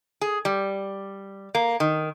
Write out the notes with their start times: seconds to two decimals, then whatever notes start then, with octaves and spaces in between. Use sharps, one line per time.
0.21 G#4
0.45 G3
1.55 A#3
1.80 D#3